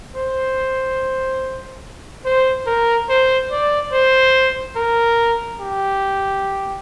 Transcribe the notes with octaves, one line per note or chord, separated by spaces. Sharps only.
C5
C5
A#4
C5
D5
C5
A#4
G4